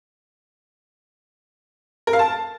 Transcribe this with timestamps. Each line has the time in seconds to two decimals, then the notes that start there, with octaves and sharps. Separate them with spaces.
2.07 A#4
2.13 F5
2.19 A5